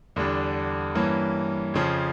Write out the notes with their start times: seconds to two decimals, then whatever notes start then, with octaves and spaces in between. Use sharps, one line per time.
0.16 E2 D3 G3 D4
0.95 G2 E3 A#3 C#4
1.74 F2 C#3 F3